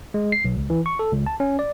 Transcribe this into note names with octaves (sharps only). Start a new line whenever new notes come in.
G#3
C7
B1
C#2
E3
C#6
A4
C#2
A5
C#4
D5